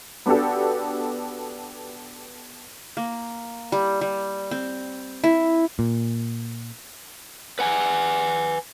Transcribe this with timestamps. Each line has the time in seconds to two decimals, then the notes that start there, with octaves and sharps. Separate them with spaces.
0.26 B3 D4 F#4 G4 A4
2.97 A#3
3.72 G3
4.01 G3
4.51 C4
5.24 E4
5.79 A#2
7.59 B4 F#5 G#5